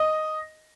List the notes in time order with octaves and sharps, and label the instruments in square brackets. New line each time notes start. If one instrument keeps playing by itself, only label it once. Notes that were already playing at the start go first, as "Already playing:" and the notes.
Already playing: [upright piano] D#5